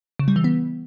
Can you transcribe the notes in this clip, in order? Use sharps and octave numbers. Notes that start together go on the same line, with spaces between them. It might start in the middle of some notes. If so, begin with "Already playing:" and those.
C#3
G3
E3
B3